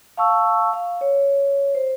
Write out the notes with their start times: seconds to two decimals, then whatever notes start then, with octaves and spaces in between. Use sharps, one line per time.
0.17 F5 A5 C#6 E6
0.73 F5
1.01 C#5
1.75 C5